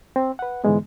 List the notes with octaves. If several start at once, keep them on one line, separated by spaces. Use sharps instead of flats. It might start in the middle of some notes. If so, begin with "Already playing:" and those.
C4
B4 F#5
G#2 D3 E3 G#3 B3